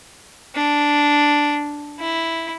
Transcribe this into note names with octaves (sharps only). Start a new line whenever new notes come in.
D4
E4